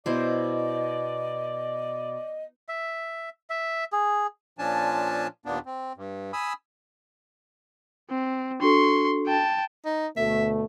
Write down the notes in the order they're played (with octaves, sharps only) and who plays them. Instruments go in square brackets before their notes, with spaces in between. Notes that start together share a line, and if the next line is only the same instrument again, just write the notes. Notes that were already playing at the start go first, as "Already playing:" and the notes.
[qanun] B2 E4 C5 [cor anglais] D5 [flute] D#5
[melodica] E5
E5
G#4
[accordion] A#2 F3 C#4 D4 G#5 A5
D#2 A#2 A#3 B3 D4
C4
G2
G#5 B5 D#6 E6
[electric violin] C4
[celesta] D4 F#4 A4 [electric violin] C6 C#6
[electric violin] G5 A5
[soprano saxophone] D#4
[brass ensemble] D2 B2 A3 [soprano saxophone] E5